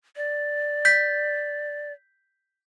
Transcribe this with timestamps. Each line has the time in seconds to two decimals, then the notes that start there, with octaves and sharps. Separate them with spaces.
0.16 D5
0.85 G6 B6